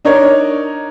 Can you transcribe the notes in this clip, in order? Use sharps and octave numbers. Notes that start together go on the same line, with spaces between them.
D4 D#4 A#4 C#5